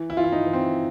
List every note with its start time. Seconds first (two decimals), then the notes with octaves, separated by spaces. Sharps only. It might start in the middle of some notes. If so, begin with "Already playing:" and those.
Already playing: E3
0.10 E4
0.17 E3 F4
0.24 E4
0.32 D#4
0.46 E3
0.53 C4